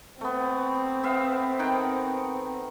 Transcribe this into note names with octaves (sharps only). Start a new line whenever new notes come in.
A3 B3 C4
B3 E5 F5
D#3 F#5 G5